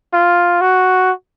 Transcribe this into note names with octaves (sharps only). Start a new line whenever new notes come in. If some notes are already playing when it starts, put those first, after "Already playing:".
F4
F#4